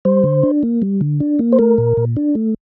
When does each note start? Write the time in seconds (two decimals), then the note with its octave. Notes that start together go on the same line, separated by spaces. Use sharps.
0.05 G3 C5
0.24 D3
0.43 D4
0.63 A#3
0.82 G3
1.01 D3
1.20 D4
1.39 A#3
1.53 C5
1.59 A3 A#4
1.78 A#2
1.97 A#2
2.17 D4
2.35 A3